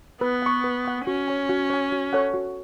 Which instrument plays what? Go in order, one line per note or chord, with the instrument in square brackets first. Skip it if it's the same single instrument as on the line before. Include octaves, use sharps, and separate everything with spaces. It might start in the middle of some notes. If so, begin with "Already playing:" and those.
[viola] B3 [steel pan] B4
[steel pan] F#5 C#6
B4
F#5 C#6
[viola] C#4 [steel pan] F#4
[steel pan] C#5 G#5
F#4
C#5 G#5
F#4
A4 C#5 F#5
F#4